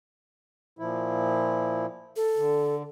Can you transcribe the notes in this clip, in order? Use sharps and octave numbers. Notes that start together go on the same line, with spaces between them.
A#2 F3 E4
A4
D3